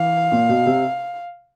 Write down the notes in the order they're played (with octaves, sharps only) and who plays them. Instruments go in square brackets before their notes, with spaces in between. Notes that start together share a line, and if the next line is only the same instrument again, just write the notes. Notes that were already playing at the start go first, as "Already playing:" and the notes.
Already playing: [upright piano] E3 [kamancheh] F5
[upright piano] A#2
B2
C3